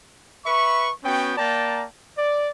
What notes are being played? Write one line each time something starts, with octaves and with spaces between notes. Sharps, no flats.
B4 E5 B5 C#6
B3 C#4 F#4 G5
A#3 D5 G5 A5 A#5
D5